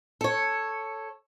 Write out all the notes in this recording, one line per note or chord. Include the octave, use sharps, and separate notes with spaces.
A4 C#5